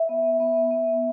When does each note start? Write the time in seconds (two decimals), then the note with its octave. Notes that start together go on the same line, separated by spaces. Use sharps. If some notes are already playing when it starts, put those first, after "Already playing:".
Already playing: E5
0.09 B3
0.40 B3
0.71 B3